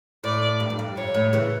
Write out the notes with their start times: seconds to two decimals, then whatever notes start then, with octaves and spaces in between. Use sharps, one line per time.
0.24 A2 D5
0.60 G2
0.70 F2
0.79 G2
0.97 F2 C#5
1.14 A2
1.33 C#3 E3